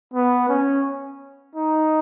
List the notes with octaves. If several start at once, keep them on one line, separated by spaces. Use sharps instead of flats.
B3
C#4
D#4